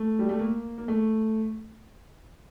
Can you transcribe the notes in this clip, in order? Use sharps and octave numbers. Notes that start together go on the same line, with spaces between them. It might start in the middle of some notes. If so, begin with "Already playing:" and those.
Already playing: A3
G3
A3
A#3
A#3
A3